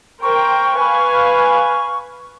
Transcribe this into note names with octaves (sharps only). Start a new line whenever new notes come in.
A#4 C5 G5 C#6
B4 F5 G#5